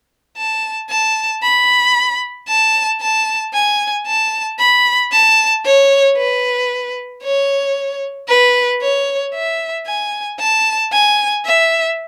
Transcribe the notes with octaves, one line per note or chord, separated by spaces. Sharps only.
A5
A5
B5
A5
A5
G#5
A5
B5
A5
C#5
B4
C#5
B4
C#5
E5
G#5
A5
G#5
E5